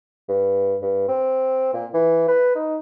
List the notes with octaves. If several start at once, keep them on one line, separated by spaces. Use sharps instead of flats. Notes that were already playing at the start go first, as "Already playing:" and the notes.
G2
G2
C4
A#2
E3
B4
D#4